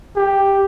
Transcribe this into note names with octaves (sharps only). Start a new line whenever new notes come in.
G4